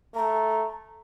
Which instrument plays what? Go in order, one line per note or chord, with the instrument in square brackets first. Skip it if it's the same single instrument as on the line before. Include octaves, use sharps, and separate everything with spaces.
[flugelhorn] A3 [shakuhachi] A#5